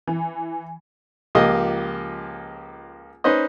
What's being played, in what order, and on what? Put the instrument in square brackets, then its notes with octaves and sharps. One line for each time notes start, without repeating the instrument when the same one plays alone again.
[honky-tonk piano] E3
[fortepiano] C#2 F3 A#3 G4 D#5
C#4 D#4 B4 C5 D#5